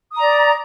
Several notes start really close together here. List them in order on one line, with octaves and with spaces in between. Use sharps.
D#6 A#5 D5